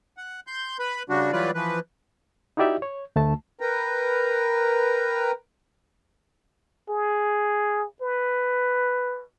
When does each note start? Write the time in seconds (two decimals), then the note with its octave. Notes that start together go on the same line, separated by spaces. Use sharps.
0.17 F#5
0.47 C6 G6
0.79 B4 B5
1.09 C#3 G3 D4 F#4
1.32 E3 F#3 G3 F4 B4 D5
1.55 E3 F3 B4
2.57 D#4 E4 F#4 G4 D5 E5
2.82 C#5
3.16 D2 A3 A5
3.60 A#4 B4 G5 A#5
6.89 G#4
8.02 B4